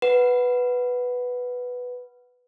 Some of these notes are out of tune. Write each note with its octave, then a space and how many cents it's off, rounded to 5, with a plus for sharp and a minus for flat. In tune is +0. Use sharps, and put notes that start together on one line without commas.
B4 +0 F#5 +0